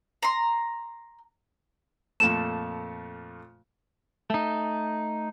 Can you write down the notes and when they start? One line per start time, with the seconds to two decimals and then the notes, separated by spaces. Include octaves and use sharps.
0.23 A#5 C6
2.20 F2 A#2 A3 E7
4.30 A3 D#4